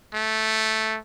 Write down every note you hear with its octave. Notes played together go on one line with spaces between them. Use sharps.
A3